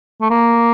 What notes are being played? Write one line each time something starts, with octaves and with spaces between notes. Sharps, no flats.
A3
A#3